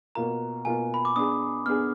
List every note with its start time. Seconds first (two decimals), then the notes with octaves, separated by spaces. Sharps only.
0.15 B2 A#3 F4 A#4 A#5
0.65 B2 A#3 F4 A#4 G#5
0.94 B5
1.05 D6
1.15 B3 D4 G#4 D#6
1.66 B3 D4 G#4 F6